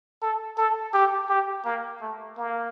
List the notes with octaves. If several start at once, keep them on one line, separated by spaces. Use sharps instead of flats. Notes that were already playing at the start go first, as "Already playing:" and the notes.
A4
A4
G4
G4
A#3
A3
A#3